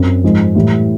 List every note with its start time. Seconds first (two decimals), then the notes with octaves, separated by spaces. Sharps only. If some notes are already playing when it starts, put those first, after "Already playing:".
Already playing: F#2 C4
0.24 G#2 F3 G#3
0.55 A2 E3 G3